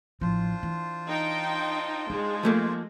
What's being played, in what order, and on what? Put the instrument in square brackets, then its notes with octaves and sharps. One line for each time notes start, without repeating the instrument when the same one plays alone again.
[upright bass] A1 F3 [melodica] D4 F4 C5
[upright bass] E3
[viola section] D#4 G5
[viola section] G#3 [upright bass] D#4
[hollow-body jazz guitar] F3 A3 A#3